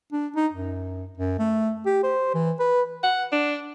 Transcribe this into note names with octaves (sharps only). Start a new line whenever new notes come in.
D4
D#4
F#2
F#2
A3
G4
C5
E3
B4
F#5
D4